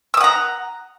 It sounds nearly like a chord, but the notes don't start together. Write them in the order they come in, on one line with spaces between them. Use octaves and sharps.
E6 D#6 F#5 A#5